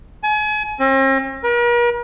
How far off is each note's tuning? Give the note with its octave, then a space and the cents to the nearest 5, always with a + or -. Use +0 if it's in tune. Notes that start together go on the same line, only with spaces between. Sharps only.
G#5 +35
C4 +45
A#4 +45